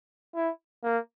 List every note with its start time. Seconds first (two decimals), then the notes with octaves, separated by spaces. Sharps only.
0.35 E4
0.83 A#3